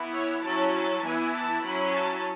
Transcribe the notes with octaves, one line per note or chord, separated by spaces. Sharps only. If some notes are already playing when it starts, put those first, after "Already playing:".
Already playing: E3 B3 E4
C#5
F#3 C#4 E4 A5
A5
E3 B3 E4 G#5
A5
F#3 C#4 E4 B5
A5